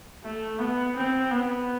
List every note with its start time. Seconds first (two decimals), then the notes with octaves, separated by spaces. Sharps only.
0.24 A3
0.59 B3
0.96 C4
1.31 B3